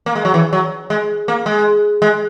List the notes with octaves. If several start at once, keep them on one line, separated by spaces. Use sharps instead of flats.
A#3
G#3
F#3
E3
F#3
G#3
A#3
G#3
G#3